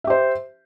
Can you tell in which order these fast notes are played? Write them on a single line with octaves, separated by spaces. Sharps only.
E5 G4 C5